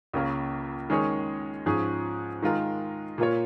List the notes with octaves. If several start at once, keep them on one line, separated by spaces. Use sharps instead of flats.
C#2 C#3 A#3 C#4 A#4
D#3 G#3 C#4 G#4 C#5
G#2 F3 C#4 G#4
D#3 G#3 F4 A#4
A#2 A#3 F4 A#4 C#5